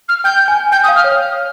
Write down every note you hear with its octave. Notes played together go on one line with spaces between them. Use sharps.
F6
G5 G6
G#5
G5 G6
D#6
F5
F6
C#5